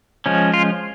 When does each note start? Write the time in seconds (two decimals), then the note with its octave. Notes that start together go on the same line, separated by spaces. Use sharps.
0.26 F3 G#3 C#4
0.54 F4